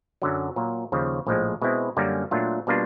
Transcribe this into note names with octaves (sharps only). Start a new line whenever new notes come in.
F#2 D3 F#3
A#2 F#3 A#3
D#2 C#3 F3
A#1 A2 F3 G#3
B2 G#3 C4 E4
F#2 D3 G3 A#3 C#4
A#2 F#3 A3 D4 F4
B2 G3 A#3 D4 F4